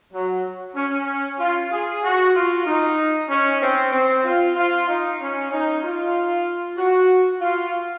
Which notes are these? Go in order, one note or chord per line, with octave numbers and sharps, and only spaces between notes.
F#3
C#4
F4
G#4
F#4
F4
D#4
C#4
C4
C4
F4
F4
D#4
C#4
D#4
F4
F#4
F4